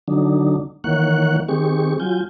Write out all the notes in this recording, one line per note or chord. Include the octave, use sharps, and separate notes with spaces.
D3 F#3 D4 D#4
D#3 E3 A#3 C#5 F#5 F#6
D#3 C4 G4 G#4 C#6
F#3 F4 G#5 G6